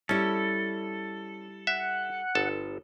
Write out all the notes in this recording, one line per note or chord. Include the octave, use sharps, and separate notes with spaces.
G3 C#4 E4 A4
E5 F#5
G1 A4 A5